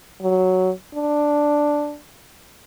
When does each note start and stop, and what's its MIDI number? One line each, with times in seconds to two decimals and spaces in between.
0.22 0.71 54
0.95 1.97 62